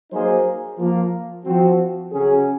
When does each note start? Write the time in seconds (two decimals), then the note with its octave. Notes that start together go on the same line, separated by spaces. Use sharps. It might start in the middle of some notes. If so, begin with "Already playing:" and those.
0.11 F#3 A#3 D#4 G#4 C5
0.77 F3 A#3 F4
1.44 F3 C4 F#4
2.11 C#3 F#3 C#4 G#4